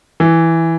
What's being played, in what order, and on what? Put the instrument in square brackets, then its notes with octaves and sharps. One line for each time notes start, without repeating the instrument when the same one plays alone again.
[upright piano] E3